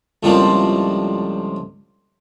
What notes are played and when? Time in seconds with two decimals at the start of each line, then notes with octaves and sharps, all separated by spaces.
0.23 C#2 A2 F3 G3 A#3 C4